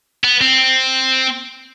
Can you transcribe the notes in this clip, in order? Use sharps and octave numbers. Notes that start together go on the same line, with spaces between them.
B3
C4